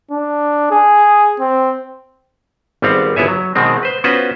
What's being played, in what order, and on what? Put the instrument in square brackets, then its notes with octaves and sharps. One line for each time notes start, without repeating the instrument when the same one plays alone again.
[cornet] D4
G#4
C4
[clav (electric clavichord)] G#1 G3 B3 C4 F5 F#5
G1 B3 E4 C#5 E5 G#5
F#3
B2 D#3 G#3 C4
B4 C5
B3 C#4 F4 F#4 B4 C5